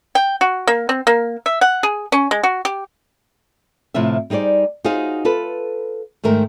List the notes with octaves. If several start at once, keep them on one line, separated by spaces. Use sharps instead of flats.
G5
F#4
A#3
C4
A#3
E5
F#5
G#4
C#4
G#3
F#4
G4
A2 C3 F3 E4 F4 E5
G3 D#4 G#4 C5 D5
D#4 F4 F#4 G#4 C5 F5
F4 A4 B4
G#2 D#3 A3 A#4 C5